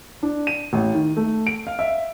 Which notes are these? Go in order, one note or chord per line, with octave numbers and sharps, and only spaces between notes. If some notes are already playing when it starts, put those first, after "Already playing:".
D4
D#7
A1
D#3
A3
D7
F5
E5